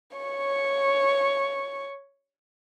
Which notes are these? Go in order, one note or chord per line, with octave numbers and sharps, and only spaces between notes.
C#5 C#6